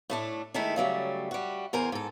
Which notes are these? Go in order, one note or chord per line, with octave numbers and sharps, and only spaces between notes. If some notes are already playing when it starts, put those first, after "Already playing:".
A2 A3 D4
D#3 G#3 A3 D#4 E4
C#3 F#3 G3 A3
G3 F#4
E2 A#4 C5 G#5
G#2 A4